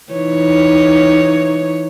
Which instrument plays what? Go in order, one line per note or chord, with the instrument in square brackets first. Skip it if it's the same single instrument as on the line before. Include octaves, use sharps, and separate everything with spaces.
[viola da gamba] E3 D#4 C#5